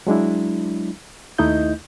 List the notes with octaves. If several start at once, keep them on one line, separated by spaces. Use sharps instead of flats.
F#3 G#3 D4 E4
D#2 A3 D#4 E4 D#5 G6